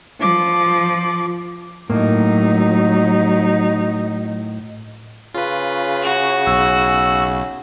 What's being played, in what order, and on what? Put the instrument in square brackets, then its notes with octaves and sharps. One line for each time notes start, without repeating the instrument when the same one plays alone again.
[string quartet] F3 D6
[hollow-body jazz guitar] A2 A#3 [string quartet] F#3 D#4
[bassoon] C#3 [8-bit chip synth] F4 B4
[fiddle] F#4
[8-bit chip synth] B1 [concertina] E6